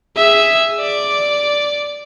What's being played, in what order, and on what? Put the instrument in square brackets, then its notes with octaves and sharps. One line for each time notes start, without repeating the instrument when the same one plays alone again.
[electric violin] G#4 E5
D5